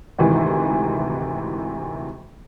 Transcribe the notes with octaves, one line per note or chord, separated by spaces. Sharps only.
D2 G#2 C3 D#3 E3